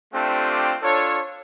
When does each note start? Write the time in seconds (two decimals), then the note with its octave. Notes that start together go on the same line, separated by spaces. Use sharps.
0.14 A3 C4 D4 F4 G4
0.82 D4 F4 A4 C#5